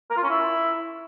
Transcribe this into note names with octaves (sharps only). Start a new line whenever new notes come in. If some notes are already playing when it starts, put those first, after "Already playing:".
A#4
F4
C#4
E4